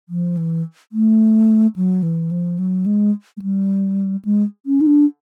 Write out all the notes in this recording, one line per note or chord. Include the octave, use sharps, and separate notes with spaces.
F3
E3
A3
F#3
E3
F3
F#3
G#3
G#3
G3
G#3
C#4
D#4
D4